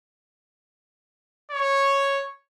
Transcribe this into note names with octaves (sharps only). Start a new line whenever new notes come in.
C#5